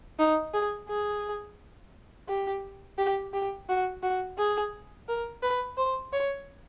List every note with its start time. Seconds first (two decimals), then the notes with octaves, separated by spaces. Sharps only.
0.19 D#4
0.54 G#4
0.89 G#4
2.28 G4
2.98 G4
3.33 G4
3.69 F#4
4.03 F#4
4.38 G#4
5.08 A#4
5.43 B4
5.77 C5
6.13 C#5